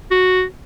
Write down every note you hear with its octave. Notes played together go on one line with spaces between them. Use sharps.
F#4